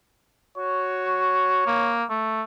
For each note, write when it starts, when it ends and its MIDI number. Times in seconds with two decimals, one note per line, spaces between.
0.58 1.62 66
0.58 1.97 73
1.67 2.04 58
2.10 2.42 57